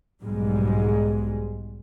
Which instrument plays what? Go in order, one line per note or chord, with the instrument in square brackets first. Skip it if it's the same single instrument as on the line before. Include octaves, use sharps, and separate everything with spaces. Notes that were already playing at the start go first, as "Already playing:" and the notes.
[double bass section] B1 G#2 G3 G#3